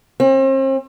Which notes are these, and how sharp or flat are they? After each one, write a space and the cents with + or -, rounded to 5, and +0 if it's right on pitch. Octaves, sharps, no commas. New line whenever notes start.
C4 +40